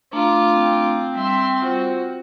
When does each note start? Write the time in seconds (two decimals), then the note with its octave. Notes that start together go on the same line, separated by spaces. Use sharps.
0.13 A3 D4 F4 A#5 D6
0.54 C4
1.16 G3 E5 C6
1.62 F4 F#4 C5